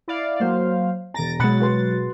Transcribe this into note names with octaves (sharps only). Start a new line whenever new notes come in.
E4 D5 F5
F#3 A#3 C5 F5
E1 A#5 A6 A#6 D7
B2 F#3 G#3 B5 F#6 A6 C#7
F#4 B4 C6